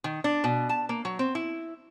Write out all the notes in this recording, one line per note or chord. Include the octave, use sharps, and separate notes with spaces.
D#3
D4
B2
A5
A#3
F#3
C4
E4